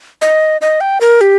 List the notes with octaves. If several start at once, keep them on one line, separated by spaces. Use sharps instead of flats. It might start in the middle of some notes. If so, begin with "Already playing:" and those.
D#5
D#5
G5
A#4
G4